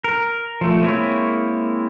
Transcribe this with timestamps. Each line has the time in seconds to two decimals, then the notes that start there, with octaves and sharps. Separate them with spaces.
0.04 A#4
0.61 F3 A3
0.82 G#3 A#3 C4 E4 C#5